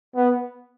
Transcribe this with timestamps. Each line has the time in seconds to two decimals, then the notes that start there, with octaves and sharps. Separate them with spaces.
0.16 B3